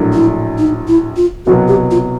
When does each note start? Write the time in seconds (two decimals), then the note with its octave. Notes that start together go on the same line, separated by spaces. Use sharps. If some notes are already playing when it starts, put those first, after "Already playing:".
Already playing: A#1 A2 F#3 A#3 D4
0.13 E4
0.58 D#4
0.88 E4
1.17 F4
1.46 C2 B2 F#3 B3 F#4
1.68 G4
1.91 F4